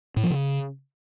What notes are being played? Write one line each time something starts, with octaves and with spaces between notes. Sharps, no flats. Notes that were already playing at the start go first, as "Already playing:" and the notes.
A2
F3
C#3